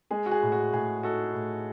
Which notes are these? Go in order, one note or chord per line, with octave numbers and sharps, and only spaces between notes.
G#3 G#4
F#4
G#4
A2
F#4
A2 G#4
D#4 F#4 A4
A2